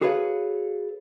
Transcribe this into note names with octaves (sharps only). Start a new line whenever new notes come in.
F#4 G#4 A4 B4 C#5 F5